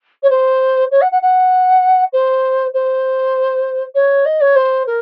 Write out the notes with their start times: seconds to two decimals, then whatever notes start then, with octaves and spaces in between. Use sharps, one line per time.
0.23 C#5
0.30 C5
0.91 C#5
1.01 F#5
1.11 F#5
1.22 F#5
2.13 C5
2.74 C5
3.95 C#5
4.25 D#5
4.41 C#5
4.55 C5
4.86 A#4